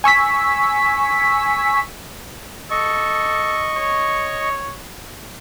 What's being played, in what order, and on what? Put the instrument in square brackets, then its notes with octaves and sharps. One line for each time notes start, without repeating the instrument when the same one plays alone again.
[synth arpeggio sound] G#5 C#6 E6 B6
[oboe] A4 [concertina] D#5 C#6
[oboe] C#5